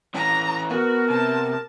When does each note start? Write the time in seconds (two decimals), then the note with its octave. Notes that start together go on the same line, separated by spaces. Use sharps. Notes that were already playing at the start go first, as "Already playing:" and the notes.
0.15 E3 C#4 A#5
0.70 B3 F#4 A#4
1.10 C3 A5